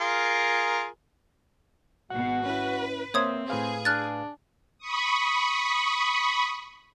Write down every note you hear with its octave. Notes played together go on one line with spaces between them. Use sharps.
F4 G#4 A#4
G#1 B2 F#4 F#5
C#4 E4 B4
A#3 C4 C5 C#5 E5 D#6 G#6
A2 G#4 B4 F5
D4 F6 F#6 A6
B5 C#6 D#6